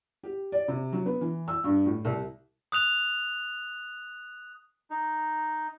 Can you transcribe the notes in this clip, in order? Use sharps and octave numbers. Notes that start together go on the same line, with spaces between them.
G4
D5
C3
F#3
B3
E3
E6
G2
A2
C2
D#6 F#6 F7
D#4